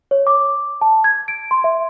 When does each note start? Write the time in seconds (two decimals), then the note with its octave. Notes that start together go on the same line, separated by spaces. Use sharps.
0.11 C#5
0.27 D6
0.81 A5
1.04 G#6
1.28 D7
1.51 C6
1.64 E5